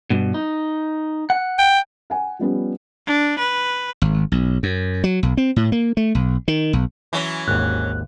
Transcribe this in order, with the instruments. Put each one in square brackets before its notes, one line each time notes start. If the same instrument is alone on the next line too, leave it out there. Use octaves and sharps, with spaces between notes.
[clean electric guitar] G2 B2
D#4
F#5
[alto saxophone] G5
[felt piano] F#5 G#5
F3 G3 B3 C#4
[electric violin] D4
B4
[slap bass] G#1
B1
F#2
F#3
B1
C4
A2
A#3
A3
B1
D#3
B1
[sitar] E3 F#3 C#4
[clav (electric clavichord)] G#1 D#2 [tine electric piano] F#6